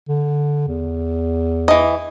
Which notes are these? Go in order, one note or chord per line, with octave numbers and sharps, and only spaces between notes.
D3
E2
E3 D#5